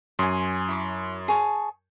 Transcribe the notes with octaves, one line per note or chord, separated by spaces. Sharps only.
F#2 C#5 G#5 C6 D#6
E4 C#5 D6
G#4 C#5 A5